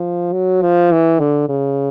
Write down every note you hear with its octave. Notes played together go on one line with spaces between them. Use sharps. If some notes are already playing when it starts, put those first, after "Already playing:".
Already playing: F3
F#3
F3
E3
D3
C#3